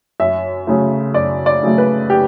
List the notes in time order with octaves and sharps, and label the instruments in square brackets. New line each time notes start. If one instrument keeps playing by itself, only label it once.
[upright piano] F#2 E5
C#3 F#3 A3
F#2 D5
D5
C#3 F#3 A3
B4
G4